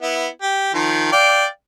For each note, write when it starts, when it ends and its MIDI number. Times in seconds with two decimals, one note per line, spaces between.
0.02 0.27 59
0.02 0.27 64
0.42 0.72 67
0.74 1.09 51
0.74 1.09 53
1.12 1.45 74
1.12 1.45 77
1.12 1.45 79